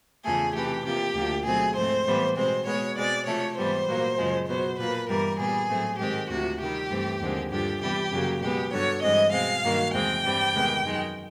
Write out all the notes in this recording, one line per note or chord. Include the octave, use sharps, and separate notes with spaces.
E2 C#3 F3 A3 G#4
C3 E3 A3 G4
C3 F3 A#3 G4
D2 D3 F3 A#3
B2 F#3 A3 C4 G#4
G#2 F3 A3 C4 C5
A2 E3 G3 B3
B2 G#3 C4 C5
B2 G#3 B3 C#5
B2 G#3 C4 D5
C3 F3 A3 C#5
G#2 E3 G3 B3 C5
A#2 F#3 A#3
F#2 C#3 F3 G#3
B2 F#3 B3 C5
A#2 F3 A#3 B4
G2 E3 G3 B3 A#4
A#2 G3 B3 G#4
A2 F#3 A3 C4
G#2 D#3 G#3 C4 G4
D2 C3 F3 F#4
C3 D#3 G3 G4
G2 E3 A3 C4
D#2 D3 F3 G#3 C4
G2 D3 F3 G4
C3 E3 G3 B3 G4
F#2 C#3 F#3 A#3
B2 G#3 B3 G4
G2 D3 F#3 C#5
G2 E3 G#3 C4 D#5
B2 G#3 C4 F5
G2 D#3 F#3 A#3
E2 C3 E3 G#3 C4 G5
G2 E3 G3 C4
E2 C3 D#3 G#3 B3
F#2 D#3 G#3